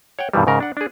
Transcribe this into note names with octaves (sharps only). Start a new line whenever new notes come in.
C#5 F#5 G5
G2 B2 D#3 E3 G3
G#2 C#3 A#4
D4 F#5
D4 G#4